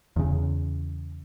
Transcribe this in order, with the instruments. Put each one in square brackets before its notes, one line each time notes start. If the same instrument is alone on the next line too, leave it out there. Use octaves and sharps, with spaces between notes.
[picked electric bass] E2 C#3